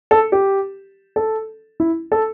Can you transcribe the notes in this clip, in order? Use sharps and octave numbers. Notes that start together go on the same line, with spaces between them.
A4
G4
A4
E4
A4